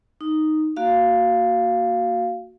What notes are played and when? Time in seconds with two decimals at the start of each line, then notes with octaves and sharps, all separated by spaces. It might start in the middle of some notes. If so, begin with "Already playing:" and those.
0.21 D#4
0.77 A#3 F#4 F5